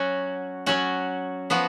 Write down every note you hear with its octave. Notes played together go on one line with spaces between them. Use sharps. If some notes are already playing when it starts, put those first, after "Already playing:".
Already playing: F#3 C#4 F#4
F#3 C#4 F#4
F3 B3 F#4